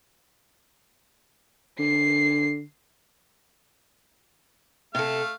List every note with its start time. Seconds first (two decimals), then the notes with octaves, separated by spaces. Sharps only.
1.79 D3 C7
4.95 C3 A3 A4 F5